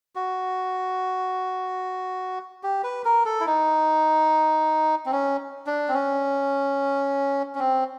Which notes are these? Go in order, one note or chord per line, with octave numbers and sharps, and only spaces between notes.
F#4
G4
B4
A#4
A4
E4
D#4
C4
C#4
D4
C4
C#4
C#4
C4